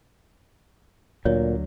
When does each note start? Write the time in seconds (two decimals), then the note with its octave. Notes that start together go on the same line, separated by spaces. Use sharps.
1.25 D2 A#2 D3 F#3 C#5